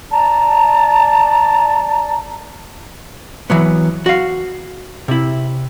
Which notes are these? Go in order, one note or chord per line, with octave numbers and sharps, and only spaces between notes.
D5 A5 A#5
E3 F#3 B3
F#4 F5
C3 E4